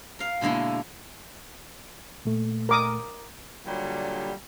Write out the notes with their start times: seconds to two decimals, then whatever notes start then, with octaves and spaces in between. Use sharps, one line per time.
0.19 A#4 F5
0.41 B2 D3 G#3 A#3 E4
2.25 A#2 A3
2.69 A#4 D6 D#6
3.66 A#2 D3 F#3 G3